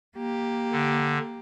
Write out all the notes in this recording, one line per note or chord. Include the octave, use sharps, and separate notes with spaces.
A#3 G4
D3